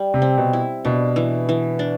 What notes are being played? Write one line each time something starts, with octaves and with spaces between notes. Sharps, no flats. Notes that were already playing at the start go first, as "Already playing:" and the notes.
Already playing: G3
C3
C4
B2
E4
B2 D4
E3
E3
D4